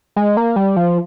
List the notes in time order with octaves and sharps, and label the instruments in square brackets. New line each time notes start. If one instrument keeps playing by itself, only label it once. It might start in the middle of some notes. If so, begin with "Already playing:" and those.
[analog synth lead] G#3
A#3
G3
F3